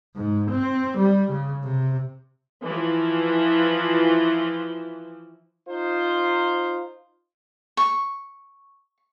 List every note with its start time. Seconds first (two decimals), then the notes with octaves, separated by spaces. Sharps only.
0.16 G#2
0.51 C4
0.98 G3
1.32 C#3
1.63 C3
2.64 E3 F3
5.67 D#4 F4 C5
7.77 C#6